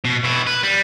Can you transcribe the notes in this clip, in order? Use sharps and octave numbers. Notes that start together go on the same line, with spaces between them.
B2
B2 E4
B4
G3